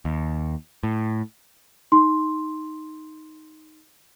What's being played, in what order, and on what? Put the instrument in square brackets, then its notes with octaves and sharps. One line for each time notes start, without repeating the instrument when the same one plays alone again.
[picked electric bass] D#2
A2
[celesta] D#4 C6